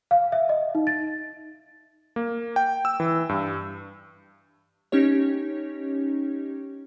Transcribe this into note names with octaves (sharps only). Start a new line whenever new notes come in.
F5
E5
D#5
D#4
A6
A#3
G5
E6
E3
G2
C#4 D#4 G4 C#5